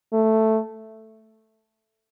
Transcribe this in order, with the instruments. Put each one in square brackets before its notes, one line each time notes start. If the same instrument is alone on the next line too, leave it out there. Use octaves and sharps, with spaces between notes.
[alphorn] A3